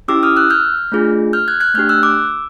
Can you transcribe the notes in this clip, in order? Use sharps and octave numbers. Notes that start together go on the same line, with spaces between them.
C#4 E4 G4 D6 E6
D#6 F6
E6 F#6
F6 G6
A3 D4 F4 G#4
F6 G6
F#6 G#6
F#6 G#6
A3 D4 G4 F6 G6
E6 F#6
D6 E6